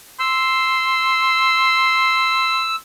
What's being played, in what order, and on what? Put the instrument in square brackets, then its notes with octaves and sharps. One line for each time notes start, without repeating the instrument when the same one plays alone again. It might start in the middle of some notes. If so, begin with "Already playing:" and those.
[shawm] C6 [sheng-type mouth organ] E6